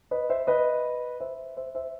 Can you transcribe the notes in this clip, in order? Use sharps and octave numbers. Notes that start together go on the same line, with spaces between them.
B4 D#5
C5 E5
B4 D#5
C5 E5
C5 E5
C5 E5